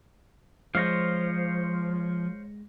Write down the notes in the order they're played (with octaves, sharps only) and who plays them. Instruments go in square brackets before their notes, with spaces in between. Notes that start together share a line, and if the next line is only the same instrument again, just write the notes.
[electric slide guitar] F3 [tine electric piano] G#3 A#6 [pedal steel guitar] C5 C#5 F5